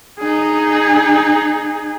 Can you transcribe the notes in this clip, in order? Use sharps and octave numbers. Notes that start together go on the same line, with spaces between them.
D#4 G#4